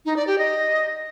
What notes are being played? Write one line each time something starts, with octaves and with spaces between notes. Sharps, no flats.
D#4
D5
G4
D#5